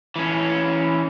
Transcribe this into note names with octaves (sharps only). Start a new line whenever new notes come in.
E3 C#4